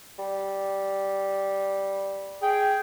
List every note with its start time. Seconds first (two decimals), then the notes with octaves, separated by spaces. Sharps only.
0.19 G3
2.42 G#4 G5